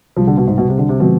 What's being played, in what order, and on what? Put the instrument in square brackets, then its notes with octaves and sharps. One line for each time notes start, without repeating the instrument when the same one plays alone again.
[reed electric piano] C2 C3 G3 [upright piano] F3
[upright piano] D3
B2
G#2
B2
C3
D3
C3
[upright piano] B2 [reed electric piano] D3 F3 G#3 C4